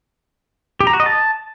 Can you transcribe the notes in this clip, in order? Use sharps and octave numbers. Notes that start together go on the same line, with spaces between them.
G4
A#5
F#4
D#5
A5